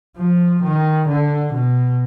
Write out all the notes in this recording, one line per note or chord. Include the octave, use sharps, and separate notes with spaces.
F3
D#3
D3
B2